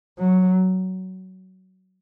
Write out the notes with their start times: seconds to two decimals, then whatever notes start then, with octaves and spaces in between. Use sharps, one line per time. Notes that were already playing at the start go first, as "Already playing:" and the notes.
0.19 F#3